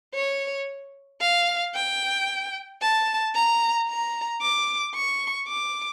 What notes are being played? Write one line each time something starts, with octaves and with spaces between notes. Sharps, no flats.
C#5
F5
G5
A5
A#5
A#5
D6
C#6
D6